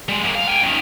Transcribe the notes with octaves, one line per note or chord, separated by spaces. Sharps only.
G3 G#3
E2 A#3
F5
G5 G#5
F#2 D#3